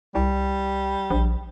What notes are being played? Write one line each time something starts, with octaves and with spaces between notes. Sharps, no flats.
C2 G3
A#1